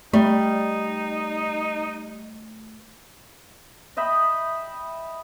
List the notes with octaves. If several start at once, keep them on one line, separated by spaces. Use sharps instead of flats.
G3 A3 D#4
D#5 E5 G5 B5